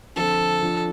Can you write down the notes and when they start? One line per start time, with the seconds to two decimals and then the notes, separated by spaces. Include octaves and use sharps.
0.16 D3 F3 C4 F4 A4
0.62 F3 D4 F4